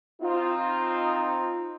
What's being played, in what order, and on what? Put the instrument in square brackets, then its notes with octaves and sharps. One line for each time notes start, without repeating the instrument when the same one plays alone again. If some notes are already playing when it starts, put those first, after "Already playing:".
[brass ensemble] C4 D#4 F4